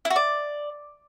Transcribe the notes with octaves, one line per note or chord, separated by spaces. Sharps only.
E4
F#4
D5